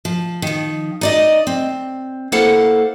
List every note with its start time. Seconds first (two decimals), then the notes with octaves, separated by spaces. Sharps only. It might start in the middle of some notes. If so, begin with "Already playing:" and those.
0.05 F3
0.42 D#3 F3
1.01 D#4 D5 D#5
1.47 C4
2.32 A#3 E4 A4 C5 F5 F#5